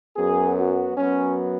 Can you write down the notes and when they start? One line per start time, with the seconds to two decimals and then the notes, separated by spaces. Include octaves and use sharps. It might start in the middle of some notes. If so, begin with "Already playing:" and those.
0.15 F#2 F#3 B3 G#4
0.57 F#4
0.97 F#2 F#3 B3 C#4